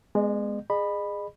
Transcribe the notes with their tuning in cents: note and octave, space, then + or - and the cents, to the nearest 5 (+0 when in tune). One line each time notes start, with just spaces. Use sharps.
G#3 +0 B3 +0 D#5 -45
G#4 -10 D#5 -40 B5 +0